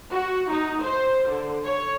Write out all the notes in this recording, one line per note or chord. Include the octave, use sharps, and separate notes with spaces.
F#4
D#4
C5
D3
C#5